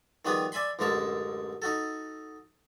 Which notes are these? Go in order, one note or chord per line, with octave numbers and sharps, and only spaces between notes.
D#3 F3 G3 B3 G#4 B4
D5 E5 G#5 B5 C6
A1 F#2 D3 G#3 A#4 A5
D#4 F#4 A4